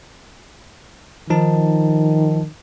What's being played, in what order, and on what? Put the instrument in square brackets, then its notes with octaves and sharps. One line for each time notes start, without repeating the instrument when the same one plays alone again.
[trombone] D#3 [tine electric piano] F3 D#4 A5